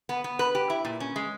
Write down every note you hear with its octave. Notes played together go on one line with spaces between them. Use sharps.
B3
B3
B4
G4
E4
A#2
C#4
G#3